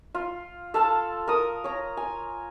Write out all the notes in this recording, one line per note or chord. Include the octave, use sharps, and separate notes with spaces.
F4
A4 F5 A5
A#4 D#6
C#5 A#5
G#5